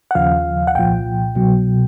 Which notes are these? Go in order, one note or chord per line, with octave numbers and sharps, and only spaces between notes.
F#5
D#2 C#3 F3 F5
F#5
C2 A#2 F3 G5
C2 B2 F#3